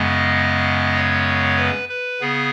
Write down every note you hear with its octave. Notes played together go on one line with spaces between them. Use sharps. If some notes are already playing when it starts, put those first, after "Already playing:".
Already playing: F#2 C#3 G#3 B3 D#5
C#5
B4
B4
C#3 B3 G#4